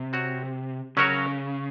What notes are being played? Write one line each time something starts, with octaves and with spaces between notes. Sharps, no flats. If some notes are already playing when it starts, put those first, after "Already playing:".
Already playing: C3
C4 F#4 C#5
C#3 F#3 C#4 F#4 A#4 C#5